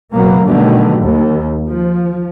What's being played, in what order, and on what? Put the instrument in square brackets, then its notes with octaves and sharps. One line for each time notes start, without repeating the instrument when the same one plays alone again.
[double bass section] F#1 B2 F#3 A#3 B3
B2 D3 D#3 F#3 G3 A3
D#2
F3